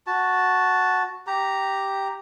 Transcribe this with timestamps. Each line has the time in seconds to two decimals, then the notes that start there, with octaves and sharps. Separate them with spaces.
0.07 F#4 A5
1.27 G4 A#5